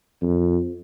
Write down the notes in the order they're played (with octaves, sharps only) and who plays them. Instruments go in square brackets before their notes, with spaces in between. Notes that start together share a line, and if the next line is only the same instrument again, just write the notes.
[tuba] F2